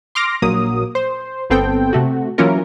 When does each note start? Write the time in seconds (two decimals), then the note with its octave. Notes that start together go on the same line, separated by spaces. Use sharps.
0.15 C6 D6 F6 A#6
0.42 A#1 F#3 A#3 D#6
0.95 C5
1.50 G1 B3 C4 A4 G5
1.93 C3 A3 F#4
2.38 E3 F#3 A#3 C#4 F4 A#4